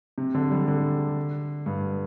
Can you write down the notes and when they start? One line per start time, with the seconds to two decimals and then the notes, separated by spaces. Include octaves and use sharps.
0.18 C3
0.34 D3
0.51 G3
0.68 D3
1.66 G2